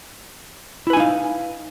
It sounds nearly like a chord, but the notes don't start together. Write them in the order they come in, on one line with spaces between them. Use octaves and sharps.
E4 B4 G#5 D#4 F5